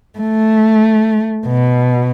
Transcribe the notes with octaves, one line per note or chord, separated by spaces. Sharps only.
A3
B2